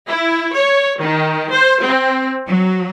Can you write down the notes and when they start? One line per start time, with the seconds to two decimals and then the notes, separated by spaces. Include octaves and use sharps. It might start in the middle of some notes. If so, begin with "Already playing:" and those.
0.10 E4
0.57 C#5
1.01 D#3
1.52 C5
1.86 C4
2.47 F#3